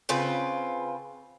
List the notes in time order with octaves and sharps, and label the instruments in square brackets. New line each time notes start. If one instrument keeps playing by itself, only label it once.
[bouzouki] C#3 C4 F4 B4